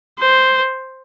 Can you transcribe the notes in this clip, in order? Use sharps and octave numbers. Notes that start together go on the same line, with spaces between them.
C5